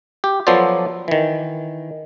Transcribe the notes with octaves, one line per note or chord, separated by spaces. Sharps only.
G4
F3 F#3 B3 A4 C5 D5
D#3 E3